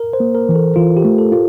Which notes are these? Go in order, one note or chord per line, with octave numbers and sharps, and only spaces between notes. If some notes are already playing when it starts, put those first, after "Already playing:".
Already playing: A#4
C5
A#3
A#4
E3
A4
E3 F4
G4
A3
A4
F4